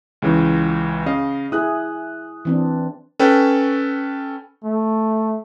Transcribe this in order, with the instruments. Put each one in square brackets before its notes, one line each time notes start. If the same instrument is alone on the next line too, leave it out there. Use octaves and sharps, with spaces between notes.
[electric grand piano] C#2 C#3 E3
C#3 D#5 F5
[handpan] E4 G#4 [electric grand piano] D#6 F#6
[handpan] E3 C4 D4
[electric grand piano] C#4 A4 B4 G5
[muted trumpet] A3